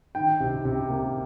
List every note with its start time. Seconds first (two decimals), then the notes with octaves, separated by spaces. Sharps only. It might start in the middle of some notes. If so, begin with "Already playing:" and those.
0.15 D#3 G5
0.40 C3
0.65 C3
0.90 A#3